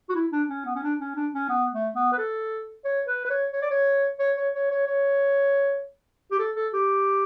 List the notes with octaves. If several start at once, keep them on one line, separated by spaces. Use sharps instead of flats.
F#4
E4
D4
C#4
B3
C#4
D4
C#4
D4
C#4
B3
A3
B3
B4
A4
C#5
B4
B4
C#5
C#5
D5
C#5
C#5
C#5
C#5
C#5
C#5
G4
A4
A4
G4